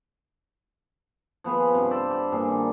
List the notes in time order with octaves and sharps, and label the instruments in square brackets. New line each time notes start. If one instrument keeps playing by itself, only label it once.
[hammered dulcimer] F3 B3 G#4 B4
G2 C3
A4 C5 B5 D6
G4
G2 A#2 D4 G#4
D#3